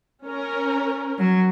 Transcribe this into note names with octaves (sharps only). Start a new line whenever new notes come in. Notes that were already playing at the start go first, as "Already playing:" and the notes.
C#4 A#4
F#3